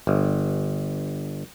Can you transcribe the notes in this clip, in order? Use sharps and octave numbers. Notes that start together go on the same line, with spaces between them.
G1